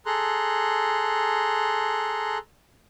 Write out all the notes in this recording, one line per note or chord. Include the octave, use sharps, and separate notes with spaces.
G#4 A4 A#5 C6 F#6